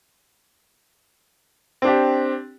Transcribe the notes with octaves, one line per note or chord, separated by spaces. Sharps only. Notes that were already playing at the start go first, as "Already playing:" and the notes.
C4 D4 G4